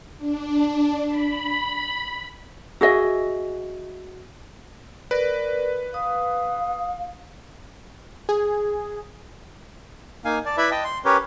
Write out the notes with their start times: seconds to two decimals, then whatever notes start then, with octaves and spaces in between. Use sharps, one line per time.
0.17 D4
1.08 B5
2.81 F#4 G#4 D#5 E5
5.11 A#4 B4 D5
5.94 F5 D#6
8.29 G#4
10.25 A#3 D#4 F5 G#5
10.46 D5 A5
10.57 E4 B4 D5 E5 B5
10.71 D#5 G5 A5
10.84 C6
11.05 C#4 G4 A#4 B4 C#5